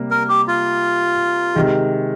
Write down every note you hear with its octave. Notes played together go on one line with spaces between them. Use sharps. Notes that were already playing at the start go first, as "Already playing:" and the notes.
Already playing: C3 G3 A#3
A#4
G4
F4
C3 D#3 G#3